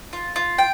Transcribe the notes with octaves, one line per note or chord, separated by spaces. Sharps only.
F4
F4
G5